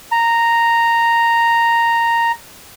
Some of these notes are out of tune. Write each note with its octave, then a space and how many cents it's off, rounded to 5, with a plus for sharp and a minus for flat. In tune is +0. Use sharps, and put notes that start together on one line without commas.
A#5 -5